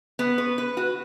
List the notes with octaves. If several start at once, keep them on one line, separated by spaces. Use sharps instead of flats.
B3
B4
B4
F#4